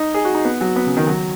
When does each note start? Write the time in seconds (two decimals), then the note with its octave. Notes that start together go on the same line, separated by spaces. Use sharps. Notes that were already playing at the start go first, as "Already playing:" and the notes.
Already playing: D#4
0.14 G#4
0.25 F#4
0.35 D#4
0.45 B3
0.61 F#3
0.76 B3
0.86 C#3
0.97 D#3
1.07 F#3